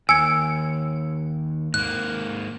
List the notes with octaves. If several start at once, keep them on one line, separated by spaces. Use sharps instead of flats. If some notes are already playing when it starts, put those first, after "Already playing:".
D#2 G#5 E6 G#6 C#7
G#2 A#3 F#6